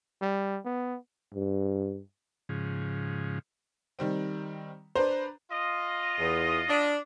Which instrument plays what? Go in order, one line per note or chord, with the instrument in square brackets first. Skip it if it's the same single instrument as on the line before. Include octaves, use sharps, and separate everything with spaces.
[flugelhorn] G3
B3
[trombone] G2
[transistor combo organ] G#2 C#3 F3
[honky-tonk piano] D#3 G3 C4
[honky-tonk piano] D4 B4 A#5 [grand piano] C5
[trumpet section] F4 D#5
[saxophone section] E2
D4